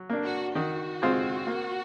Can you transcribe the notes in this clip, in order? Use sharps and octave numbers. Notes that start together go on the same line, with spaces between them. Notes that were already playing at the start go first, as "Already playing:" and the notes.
Already playing: F#3
A#3 D4
F#4
D#3 F#4
G#3 C4 F4
A#3